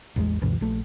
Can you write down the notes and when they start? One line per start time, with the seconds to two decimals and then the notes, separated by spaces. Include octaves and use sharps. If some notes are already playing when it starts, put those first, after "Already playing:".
0.16 A1 E2 G3 G#3
0.42 C#2 F#2 B2 E3
0.61 A#1 A3